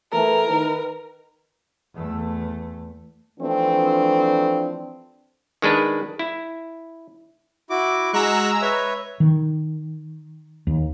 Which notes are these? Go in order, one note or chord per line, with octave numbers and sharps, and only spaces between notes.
E3 A3 A#4
D#3 B4
E2 A3
E3 F3 A3 C4 D4
D#3 G#3 D4 B4
E4
E4 F#4 D6
G#3 F#4 A#5 C#6 E6 F#6
B4 C#5 E5
D#3
D#2